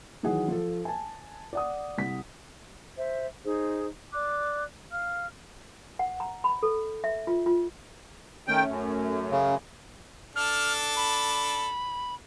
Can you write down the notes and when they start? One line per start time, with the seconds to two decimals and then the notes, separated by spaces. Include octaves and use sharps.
0.23 D#3 E3 F#3 G#4 F#5
0.48 F3 A4
0.85 G#5 A5
1.53 D5 F#5 D#6
1.98 C2 F#5 B6
2.96 C5 E5
3.45 D#4 G#4 C5
4.13 D5 D6 F#6
4.91 F5 F6
5.99 F#5
6.20 A#5
6.44 B5
6.63 A4
7.04 E5
7.27 F4
7.46 F4
8.48 D#3 A3 C#4 G5
8.68 F#2
9.31 C#3
10.36 D4 A4 F6
10.97 B5